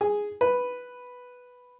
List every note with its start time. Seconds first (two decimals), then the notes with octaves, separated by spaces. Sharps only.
0.01 G#4
0.41 B4